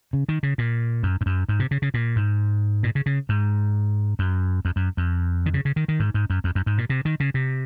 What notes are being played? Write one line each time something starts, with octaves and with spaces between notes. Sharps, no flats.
C#3
D#3
C#3
A#2
F#2
G#2
F#2
G#2
C3
C#3
C#3
A#2
G#2
A#2
C#3
C#3
G#2
F#2
F2
F#2
F2
D#3
C#3
C#3
D#3
D#3
G#2
G#2
F#2
F2
F#2
G#2
A#2
C3
D#3
C#3
C3